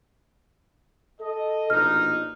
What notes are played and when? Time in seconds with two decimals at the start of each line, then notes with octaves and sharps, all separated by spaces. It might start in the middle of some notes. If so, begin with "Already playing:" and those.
1.20 A4 D#5
1.70 A#1 B2 D#4 F6